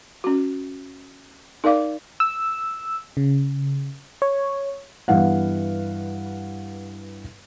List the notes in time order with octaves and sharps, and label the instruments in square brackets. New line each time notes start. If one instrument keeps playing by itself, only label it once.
[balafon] C#4 F#4
D#4 A#4 D5 F5 D6
[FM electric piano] E6
C#3
C#5
[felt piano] G2 E3 B3 F5 F#5